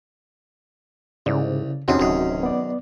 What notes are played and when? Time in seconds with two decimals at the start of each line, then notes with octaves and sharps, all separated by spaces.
1.26 C2 G#2 C#3 D5
1.88 E2 C3 C4 C#4 D#4 F#4 G#4
1.99 D1 F#2 D#3 G#4
2.43 B3 D5